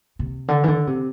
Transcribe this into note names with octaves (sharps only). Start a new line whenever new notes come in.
C3
D3
E3
D3
C3